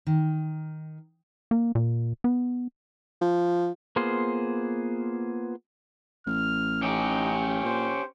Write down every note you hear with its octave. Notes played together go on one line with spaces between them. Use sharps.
D#3
A#3
A#2
B3
F3
A#3 B3 F4 G#4 C5
A1 F6
C#4 D#4 G4
A#2 C5